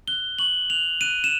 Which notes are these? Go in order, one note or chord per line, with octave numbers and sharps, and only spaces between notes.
F#6 G7
C#6 F#7
F#6 F7
F#6 D#7
E7